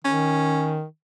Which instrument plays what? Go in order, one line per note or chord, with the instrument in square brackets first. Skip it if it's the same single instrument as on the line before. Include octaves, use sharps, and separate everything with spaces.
[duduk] D#3 [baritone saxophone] C#4